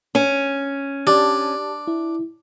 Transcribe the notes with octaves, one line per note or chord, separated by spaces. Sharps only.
C#4
D4 G4 D5 A5
E4